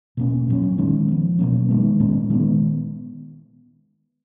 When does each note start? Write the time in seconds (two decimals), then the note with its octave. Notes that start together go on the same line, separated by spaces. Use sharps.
0.17 B2 A#3 C#4
0.48 A#2 F#3 C#4
0.78 D#3 G#3 C#4
1.08 F3 B3
1.39 B2 F#3 A#3 C#4
1.69 D#3 G#3 B3
2.00 A#2 G#3 C#4
2.30 D#3 G#3 B3